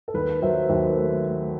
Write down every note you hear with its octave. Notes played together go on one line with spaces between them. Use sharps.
A4
D#2 B4
F#3 C5 E5
D#2 C5 E5
A3
A3